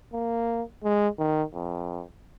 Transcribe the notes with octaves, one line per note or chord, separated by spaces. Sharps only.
A#3
G#3
D#3
F2